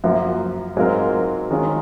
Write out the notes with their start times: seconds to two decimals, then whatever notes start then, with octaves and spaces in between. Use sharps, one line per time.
0.04 F#2 F3 A#3 F4
0.77 G#2 F#3 C4 F4 A#4
1.51 D#3 G#3 C#4 F4